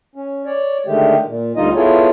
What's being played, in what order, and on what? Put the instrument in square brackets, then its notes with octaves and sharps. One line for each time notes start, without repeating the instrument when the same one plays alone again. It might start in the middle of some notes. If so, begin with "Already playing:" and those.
[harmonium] C#4
C#5 D5
D3 D#3 G#3 A3 G4
A#2
D2 D3 G3 D#4 F4 D#5
B3 E4 F4 G#4 A4 C#5